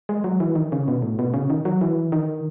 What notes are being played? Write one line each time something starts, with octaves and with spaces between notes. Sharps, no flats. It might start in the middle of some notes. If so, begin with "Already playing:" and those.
G#3
F#3
E3
D#3
C#3
B2
A2
B2
C#3
D#3
F#3
E3
D#3